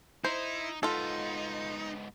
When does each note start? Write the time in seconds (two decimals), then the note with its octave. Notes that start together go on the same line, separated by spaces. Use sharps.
0.24 D#4 E4 C5
0.83 G#2 B3 D#4 F4 A4